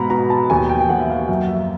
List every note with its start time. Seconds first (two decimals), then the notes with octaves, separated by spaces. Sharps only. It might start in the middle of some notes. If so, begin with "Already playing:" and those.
Already playing: G#2 B2 A#5 B5
0.10 B2 A#5
0.30 A5
0.50 D#2 G#5
0.69 G5
0.80 G5
0.90 D#2 F#5
1.00 E5
1.10 F5
1.29 F#2 E5
1.49 E5